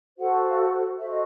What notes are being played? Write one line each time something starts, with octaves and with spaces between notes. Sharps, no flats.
F#4 A4 C5 F#5
F5
F#5
F#4 A4 C5 E5
D#5